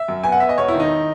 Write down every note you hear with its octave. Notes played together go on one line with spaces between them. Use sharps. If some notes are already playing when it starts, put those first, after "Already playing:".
Already playing: E5
F#2
B3 G#5
F#5
B3 E5
D#5
E1 C#5
E4
D#3
D#4